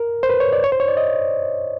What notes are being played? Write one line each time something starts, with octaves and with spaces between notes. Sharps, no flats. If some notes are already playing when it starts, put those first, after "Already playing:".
Already playing: A#4
C5
B4
C#5
D5
C#5
C5
C#5
D5
D#5